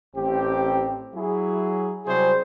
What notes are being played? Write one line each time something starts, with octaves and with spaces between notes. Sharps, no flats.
A1 C4 G4
F#3 E4 G#4
C3 F#3 G3 E4 G#4 C5